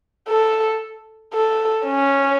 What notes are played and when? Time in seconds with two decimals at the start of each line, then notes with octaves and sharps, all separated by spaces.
0.29 A4
1.34 A4
1.86 C#4